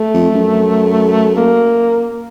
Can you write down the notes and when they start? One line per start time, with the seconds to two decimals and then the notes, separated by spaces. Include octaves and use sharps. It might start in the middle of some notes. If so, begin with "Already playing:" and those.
Already playing: A3
0.14 F2
0.34 F#2
1.36 A#3